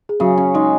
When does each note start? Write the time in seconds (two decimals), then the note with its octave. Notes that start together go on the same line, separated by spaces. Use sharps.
0.09 G#4
0.20 C#3 F#3 F#4
0.38 C#4
0.54 G#3 D#4